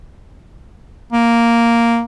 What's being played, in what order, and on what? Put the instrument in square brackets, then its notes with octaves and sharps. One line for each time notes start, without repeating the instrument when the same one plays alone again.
[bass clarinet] A#3